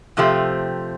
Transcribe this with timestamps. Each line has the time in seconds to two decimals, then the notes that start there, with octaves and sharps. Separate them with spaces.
0.17 C3 F3 A3 C4 G4